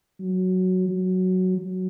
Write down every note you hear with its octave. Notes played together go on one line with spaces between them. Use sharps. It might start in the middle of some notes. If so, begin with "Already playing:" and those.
F#3
F#3
F#3